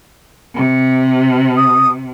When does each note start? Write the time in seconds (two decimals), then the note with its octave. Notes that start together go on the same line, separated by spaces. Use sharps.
0.54 C3
1.57 D#6